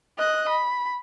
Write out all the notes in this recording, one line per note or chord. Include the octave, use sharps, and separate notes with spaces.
D#5 F#6
B5